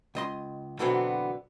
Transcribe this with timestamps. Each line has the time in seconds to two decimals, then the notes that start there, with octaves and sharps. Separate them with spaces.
0.15 C#2 D#5 C6
0.79 B2 D3 E3 F#3 B3 C4